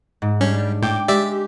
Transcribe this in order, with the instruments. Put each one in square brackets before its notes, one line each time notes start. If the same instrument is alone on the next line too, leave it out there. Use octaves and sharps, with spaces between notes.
[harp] G#2
[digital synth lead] G3 [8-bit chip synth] C#4 [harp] D4
[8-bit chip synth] A2 [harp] G5 [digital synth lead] D6
[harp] G#3 [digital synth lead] G4 [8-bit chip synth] D5 E5